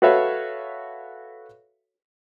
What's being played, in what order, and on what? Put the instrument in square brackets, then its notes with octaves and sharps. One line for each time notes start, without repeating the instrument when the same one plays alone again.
[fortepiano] F#4 A4 B4 C#5 E5 F5